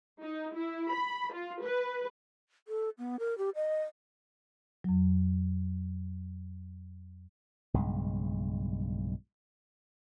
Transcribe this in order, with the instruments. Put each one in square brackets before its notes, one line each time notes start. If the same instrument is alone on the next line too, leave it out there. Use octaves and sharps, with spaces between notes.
[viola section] D#4
E4
B5
F4
B4
[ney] A4
B3
A#4
G4
D#5
[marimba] F2 F#3
[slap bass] B1 G2 C#3 G#3